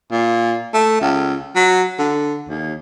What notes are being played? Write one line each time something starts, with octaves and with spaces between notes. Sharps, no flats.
A#2
A3
C#2
F#3
D3
D#2